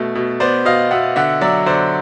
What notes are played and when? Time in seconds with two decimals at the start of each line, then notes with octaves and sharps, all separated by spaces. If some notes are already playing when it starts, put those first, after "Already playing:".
Already playing: B2 A3
0.15 B2
0.40 B3 C5 D5
0.65 B2 D#5 F5
0.91 B2 E5 F#5
1.16 D3 E5 F#5
1.41 F#3 D5 E5
1.66 D3 C5 D5